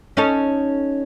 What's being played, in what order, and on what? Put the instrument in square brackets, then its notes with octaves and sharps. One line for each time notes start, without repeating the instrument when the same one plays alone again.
[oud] C#4 D#4 A4